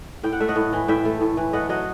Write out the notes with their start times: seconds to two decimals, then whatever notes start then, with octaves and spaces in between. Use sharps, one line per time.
0.23 A2 G5
0.33 F#5
0.40 A3 E5
0.48 D#5 F#5
0.56 A2
0.73 E3
0.88 A2 E5 G5
1.05 A3
1.21 A2
1.37 E3
1.53 A3 D#5 F#5
1.69 F#3 D#5 F#5